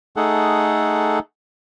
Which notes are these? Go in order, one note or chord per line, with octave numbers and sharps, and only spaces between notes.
A3 D#4 G#4 A4 F#5